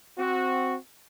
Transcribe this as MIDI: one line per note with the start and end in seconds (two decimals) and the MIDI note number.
0.19 0.76 60
0.19 0.76 66